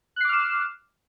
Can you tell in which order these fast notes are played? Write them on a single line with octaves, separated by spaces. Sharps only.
F#6 C7 D6 F6 E7